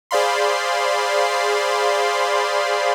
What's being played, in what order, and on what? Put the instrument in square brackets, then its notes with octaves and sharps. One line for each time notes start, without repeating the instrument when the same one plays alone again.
[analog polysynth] G#4 C5 D5 F5 B5 C6